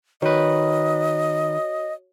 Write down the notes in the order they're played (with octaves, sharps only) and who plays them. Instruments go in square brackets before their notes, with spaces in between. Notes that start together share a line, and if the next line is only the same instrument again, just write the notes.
[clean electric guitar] D#3 B4 [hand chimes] F#4 C#5 [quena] D#5